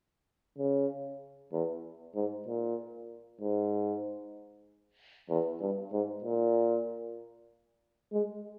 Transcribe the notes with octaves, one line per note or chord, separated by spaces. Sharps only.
C#3
E2
G#2
A#2
G#2
E2
G2
G#2
A#2
G#3